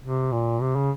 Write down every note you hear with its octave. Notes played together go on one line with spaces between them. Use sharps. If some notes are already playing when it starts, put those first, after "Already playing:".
C3
A#2
C3
C#3